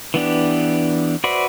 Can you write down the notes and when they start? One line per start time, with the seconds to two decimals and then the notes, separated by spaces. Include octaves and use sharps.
0.14 E3 B3 D4 G4
1.24 F#4 B4 C5 D5 E5